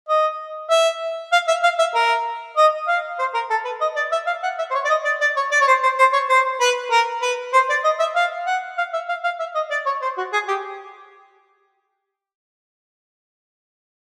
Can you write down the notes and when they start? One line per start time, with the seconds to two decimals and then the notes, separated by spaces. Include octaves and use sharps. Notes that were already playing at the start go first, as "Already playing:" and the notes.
0.09 D#5
0.70 E5
1.32 F5
1.48 E5
1.63 F5
1.79 E5
1.95 A#4
2.57 D#5
2.88 F5
3.19 C5
3.34 A#4
3.50 A4
3.65 B4
3.81 D#5
3.96 D5
4.12 E5
4.27 F5
4.43 F#5
4.58 E5
4.70 C5
4.74 C#5
4.85 D5
4.89 D#5
5.05 D5
5.21 D5
5.36 C#5
5.52 D5
5.61 C#5
5.67 C5
5.83 C5
5.99 C5
6.13 C#5
6.29 C5
6.60 B4
6.91 A#4
7.22 B4
7.53 C5
7.69 D5
7.84 D#5
7.99 E5
8.15 F5
8.46 F#5
8.78 F5
8.93 E5
9.09 F5
9.24 F5
9.39 E5
9.55 D#5
9.71 D5
9.86 C#5
10.02 C5
10.17 F#4
10.33 G#4
10.48 G4